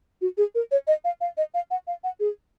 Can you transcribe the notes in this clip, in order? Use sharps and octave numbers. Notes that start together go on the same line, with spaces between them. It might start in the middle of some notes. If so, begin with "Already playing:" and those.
F#4
G#4
A#4
C#5
D#5
F5
F5
D#5
F5
F#5
F5
F#5
G#4